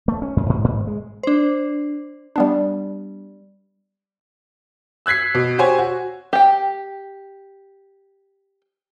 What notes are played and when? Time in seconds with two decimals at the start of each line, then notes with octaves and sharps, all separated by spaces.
0.08 A3
0.22 C#4
0.37 F#2
0.49 G#2
0.64 G#2
0.87 G#3
1.23 D4 C5
2.36 G3 B3 D4
5.06 E6 F#6 G#6 B6 C7
5.35 B2
5.58 F#4 G4 C5 C#5 G#5
5.78 F#4
6.33 G4 G5